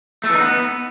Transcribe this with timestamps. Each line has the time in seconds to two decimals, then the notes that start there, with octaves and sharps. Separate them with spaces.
0.24 A3
0.29 E3
0.35 D#4
0.41 B3